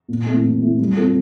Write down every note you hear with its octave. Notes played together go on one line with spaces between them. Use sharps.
A#2
A3 C4 E4
A#2
A3 C4 E4
G3
C4 F4 A4